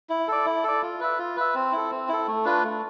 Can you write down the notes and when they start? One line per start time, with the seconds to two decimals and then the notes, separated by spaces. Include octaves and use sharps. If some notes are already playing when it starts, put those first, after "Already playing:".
0.10 E4
0.28 A4 D5
0.46 E4
0.64 A4 D5
0.82 F4
1.00 B4 E5
1.18 F4
1.37 B4 E5
1.55 C4
1.72 E4 A4
1.91 C4
2.09 E4 A4
2.27 A3
2.45 D4 F4 B4
2.63 A3